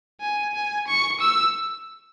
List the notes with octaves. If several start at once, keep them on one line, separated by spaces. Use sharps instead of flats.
G#5
G#5
C#6
E6